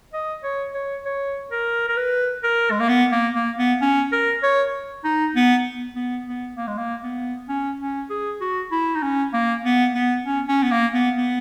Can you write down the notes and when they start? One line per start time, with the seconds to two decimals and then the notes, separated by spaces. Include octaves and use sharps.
0.13 D#5
0.43 C#5
0.74 C#5
1.05 C#5
1.51 A#4
1.88 A#4
1.97 B4
2.43 A#4
2.71 G#3
2.80 A#3
2.89 B3
3.12 A#3
3.35 A#3
3.58 B3
3.81 C#4
4.12 A#4
4.43 C#5
5.04 D#4
5.34 B3
5.95 B3
6.26 B3
6.57 A#3
6.68 G#3
6.77 A#3
7.03 B3
7.49 C#4
7.80 C#4
8.10 G#4
8.41 F#4
8.71 E4
8.95 D#4
9.02 C#4
9.33 A#3
9.64 B3
9.94 B3
10.24 C#4
10.48 C#4
10.63 B3
10.71 A#3
10.94 B3
11.17 B3